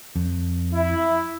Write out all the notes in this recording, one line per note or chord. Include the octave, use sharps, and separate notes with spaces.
F2
E4